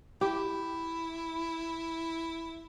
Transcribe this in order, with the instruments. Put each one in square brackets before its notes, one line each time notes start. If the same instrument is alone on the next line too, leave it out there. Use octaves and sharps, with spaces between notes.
[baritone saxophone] E4 [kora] G4